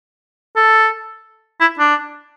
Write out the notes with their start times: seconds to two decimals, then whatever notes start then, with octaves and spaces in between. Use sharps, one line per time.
0.56 A4
1.60 E4
1.79 D4